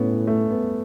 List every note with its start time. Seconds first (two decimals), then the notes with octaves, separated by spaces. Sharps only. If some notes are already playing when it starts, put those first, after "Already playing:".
Already playing: A2 B3 C#4 E4
0.27 A3
0.51 B3